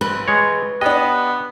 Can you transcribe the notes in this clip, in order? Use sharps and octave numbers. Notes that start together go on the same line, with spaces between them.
A1 B4
G#3 C#5
B3 D4 G4 D#5